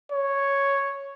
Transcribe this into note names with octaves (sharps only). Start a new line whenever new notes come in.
C#5